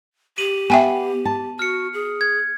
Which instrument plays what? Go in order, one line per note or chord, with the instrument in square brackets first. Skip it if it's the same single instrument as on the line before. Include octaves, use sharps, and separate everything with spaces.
[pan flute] G4 [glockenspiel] D#7 F#7
[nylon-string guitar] B3 [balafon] E5 G5 G#5
[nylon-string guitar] A5
[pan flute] F#4 [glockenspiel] F6 C#7
[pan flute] G#4
[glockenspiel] G#6